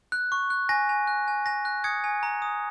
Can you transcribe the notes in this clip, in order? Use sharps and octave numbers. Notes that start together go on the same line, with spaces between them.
F#6
C#6
F#6
G#5 A#6
G#5
F#6
G#5
G#5 A#6
F#6
D#6 G#6 C#7
G#5
A#5
D#6